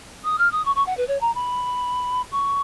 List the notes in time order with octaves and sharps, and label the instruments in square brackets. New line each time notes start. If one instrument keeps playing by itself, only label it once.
[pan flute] D#6
F6
D#6
C#6
C#6
F#5
B4
C#5
A#5
B5
C#6